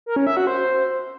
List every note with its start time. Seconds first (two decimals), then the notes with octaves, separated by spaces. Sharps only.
0.06 A#4
0.16 C#4
0.27 E5
0.37 F#4
0.47 C5